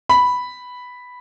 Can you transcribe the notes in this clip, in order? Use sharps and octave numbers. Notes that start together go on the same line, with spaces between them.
B5